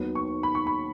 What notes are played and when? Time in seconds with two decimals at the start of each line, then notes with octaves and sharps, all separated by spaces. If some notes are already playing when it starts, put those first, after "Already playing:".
Already playing: D#2 D#3 F#3 B3
0.15 C#6
0.43 B5
0.55 C#6
0.67 B5